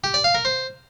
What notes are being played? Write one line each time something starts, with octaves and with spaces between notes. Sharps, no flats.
G4
D5
F5
A#4
C5